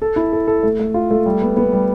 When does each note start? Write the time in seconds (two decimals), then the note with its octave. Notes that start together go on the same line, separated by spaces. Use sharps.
0.02 A4
0.16 E4
0.33 A4
0.47 A4
0.63 A3
0.79 A3
0.94 F4
1.11 A3
1.26 G3
1.42 B3
1.57 B3
1.73 G3